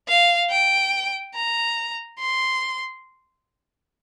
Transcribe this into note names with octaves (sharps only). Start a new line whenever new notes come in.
F5
G5
A#5
C6